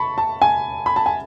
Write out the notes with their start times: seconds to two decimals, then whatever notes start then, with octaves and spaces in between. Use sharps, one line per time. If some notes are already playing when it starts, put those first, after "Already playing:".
Already playing: A5 B5 C#6
0.18 A5
0.42 G#5
0.86 B5
0.96 A5
1.06 G#5